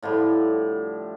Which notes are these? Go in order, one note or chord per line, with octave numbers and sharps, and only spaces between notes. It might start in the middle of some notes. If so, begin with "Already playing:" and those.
A2 D3 F3 G3